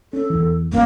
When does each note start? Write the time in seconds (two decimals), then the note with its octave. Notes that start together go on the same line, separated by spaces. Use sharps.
0.13 C#4 A4
0.30 E2 E3
0.72 G1 F2 A#3 C#4